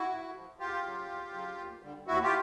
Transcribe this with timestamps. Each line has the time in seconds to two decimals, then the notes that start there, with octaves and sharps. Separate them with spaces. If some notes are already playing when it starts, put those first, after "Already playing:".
Already playing: E4 F#4
0.10 G#2
0.36 F3
0.59 E2 F4 G4
0.84 C#3 F#3
1.09 E2
1.34 C#3 F#3
1.58 D#2
1.83 D3 G3
2.07 D#2 E4 F#4
2.23 F4 G4